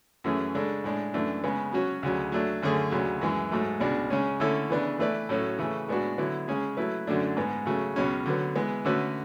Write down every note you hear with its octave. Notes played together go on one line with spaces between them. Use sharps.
F#2 E3 A3 C#4 G#4
C#3 G#3 D4 A4
A2 G#3 D4
F#2 E3 A3 D4
C#3 G#3 B3
F#3 C#4 F#4 C#5
D2 C#3 F#3
F#3 A3 D4
F#2 D3 A3 C#4 G#4
D2 C#3 F#3
F#2 E3 G#3
G#2 F#3 A3
C#2 B2 G#3 D4
C#3 G#3 C#4
D3 A3 C#4 E4 A4
C#3 E3 B3 D4
E3 A3 E4 B4 D5
A2 F#3 C#4 F#4 A4
C#3 E3 A3
A2 G#3 B3 D4 F#4
D3 F#3 B3 E4
C#3 G#3 C#4 G#4
F#3 A3 E4 B4
F#2 D3 F#3 A3 D4
G#2 G#3 B3
C#3 F#3 A3
C#2 B2 F#3 C#4
D3 F#3 B3
E3 G#3 B3
D3 A3 C#4 F#4 B4